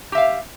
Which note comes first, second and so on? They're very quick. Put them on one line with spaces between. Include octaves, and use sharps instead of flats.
G4 E5 F5